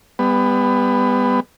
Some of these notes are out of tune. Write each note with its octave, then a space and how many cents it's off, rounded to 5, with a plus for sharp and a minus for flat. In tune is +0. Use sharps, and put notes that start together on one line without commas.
G3 +35 B3 +15